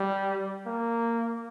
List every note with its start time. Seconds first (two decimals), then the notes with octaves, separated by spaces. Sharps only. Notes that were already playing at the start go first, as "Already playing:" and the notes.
Already playing: G3
0.66 A#3